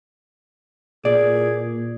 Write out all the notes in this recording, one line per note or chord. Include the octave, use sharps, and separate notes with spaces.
A#2 G#4 D5